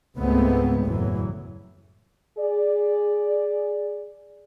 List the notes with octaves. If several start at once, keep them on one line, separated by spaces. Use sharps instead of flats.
C#2 G#2 G#3 A3 B3 C4
F#1 E2 A2 E3 F#3
G#4 D5